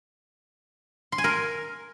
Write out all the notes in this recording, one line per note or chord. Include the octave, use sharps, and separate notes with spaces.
C6
G#5
A#4